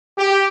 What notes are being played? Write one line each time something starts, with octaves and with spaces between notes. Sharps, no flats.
G4